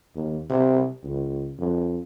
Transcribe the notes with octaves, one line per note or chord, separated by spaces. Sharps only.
D#2
C3
C#2
F2